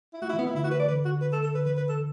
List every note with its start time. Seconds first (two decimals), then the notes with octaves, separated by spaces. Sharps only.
0.14 E4
0.22 A3 F#4
0.29 E4
0.33 E3
0.38 B3
0.44 E3 E4
0.55 D3 E4
0.64 F#4
0.71 B4
0.80 D5
0.88 D3 B4
1.05 F#4
1.21 B4
1.33 A4
1.43 A4
1.55 D3 B4
1.66 E3 B4
1.77 B4
1.89 A4